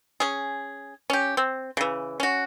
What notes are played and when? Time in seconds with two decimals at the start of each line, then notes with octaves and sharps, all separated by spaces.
0.20 C#4 G#4
1.10 C#4 G4
1.37 C4
1.77 C#3 E3
2.20 C#4 F#4